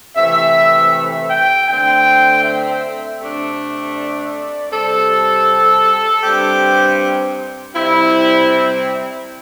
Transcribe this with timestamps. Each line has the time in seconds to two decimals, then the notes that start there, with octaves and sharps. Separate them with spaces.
0.16 C3 E3 A3 E5
1.30 G5
1.68 D3 A3 C4 G5
2.44 E5
3.20 C3 A3 D4
3.96 D5
4.71 C3 G3 C4 A4
6.23 G2 G3 C4 G4
7.75 C3 G3 C4 E4